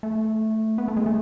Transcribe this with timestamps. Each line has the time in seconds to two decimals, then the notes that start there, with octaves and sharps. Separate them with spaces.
0.03 A3
0.78 B3
0.88 A3
0.97 G#3
1.06 A3